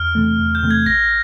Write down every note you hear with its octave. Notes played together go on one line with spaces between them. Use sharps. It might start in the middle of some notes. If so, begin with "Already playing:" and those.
Already playing: E2 F6
C3 E3 A3
E2
G6
C3 E3 A3
G#6
A1 A#6